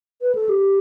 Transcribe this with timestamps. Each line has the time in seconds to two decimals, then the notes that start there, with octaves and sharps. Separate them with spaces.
0.22 B4
0.35 A4
0.49 G4